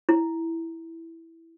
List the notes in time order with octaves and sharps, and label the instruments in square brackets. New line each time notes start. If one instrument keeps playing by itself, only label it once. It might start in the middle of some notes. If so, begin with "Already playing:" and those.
[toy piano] E4